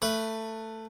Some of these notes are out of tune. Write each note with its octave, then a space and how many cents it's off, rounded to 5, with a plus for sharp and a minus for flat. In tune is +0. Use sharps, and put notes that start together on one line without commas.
A3 +15 B4 +0 B5 +0